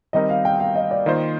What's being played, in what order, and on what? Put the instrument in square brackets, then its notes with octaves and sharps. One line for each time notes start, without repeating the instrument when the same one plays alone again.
[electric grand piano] D#3 G3 C4 D#4 A#4 [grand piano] D#5
[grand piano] F5
G5
F5
D#5
D5
[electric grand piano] D#3 A#3 F4 C5 [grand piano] D#5